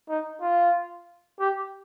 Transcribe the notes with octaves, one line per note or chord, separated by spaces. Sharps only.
D#4
F4
G4